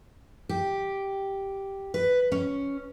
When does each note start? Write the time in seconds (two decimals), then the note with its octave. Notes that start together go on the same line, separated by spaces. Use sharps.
0.49 G4
1.94 B4
2.32 C#4